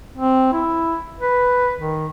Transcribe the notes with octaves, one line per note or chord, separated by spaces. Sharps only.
C4
E4
B4
D#3